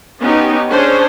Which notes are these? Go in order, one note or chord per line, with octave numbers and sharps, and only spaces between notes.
B3 C#4 D#4 G4
C#4 D4 G#4 C5 C#5